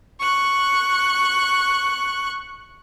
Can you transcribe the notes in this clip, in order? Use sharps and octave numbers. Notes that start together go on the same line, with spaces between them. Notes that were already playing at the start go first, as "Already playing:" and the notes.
C#6 F#6